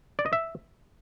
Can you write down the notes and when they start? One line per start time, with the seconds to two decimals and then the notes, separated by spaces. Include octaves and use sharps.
0.19 D5
0.26 D#5
0.33 E5